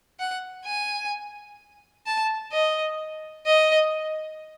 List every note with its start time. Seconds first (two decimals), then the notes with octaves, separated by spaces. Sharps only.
0.19 F#5
0.65 G#5
2.06 A5
2.52 D#5
3.46 D#5